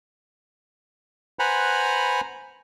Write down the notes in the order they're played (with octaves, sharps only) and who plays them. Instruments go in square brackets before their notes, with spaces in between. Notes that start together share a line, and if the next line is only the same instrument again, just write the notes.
[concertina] B4 C5 F#5 G#5 A#5 B5